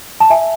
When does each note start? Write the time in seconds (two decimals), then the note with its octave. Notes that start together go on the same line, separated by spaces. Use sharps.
0.20 A5
0.30 E5 G#5